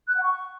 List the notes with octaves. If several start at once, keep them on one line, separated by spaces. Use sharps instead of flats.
F#6
F#5
C#6